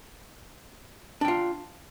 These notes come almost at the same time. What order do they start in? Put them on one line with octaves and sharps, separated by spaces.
D4 G5 F4